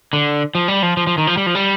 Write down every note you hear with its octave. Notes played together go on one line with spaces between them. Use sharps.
D3
F3
G3
F3
F3
F3
D#3
F3
G3
F3
G3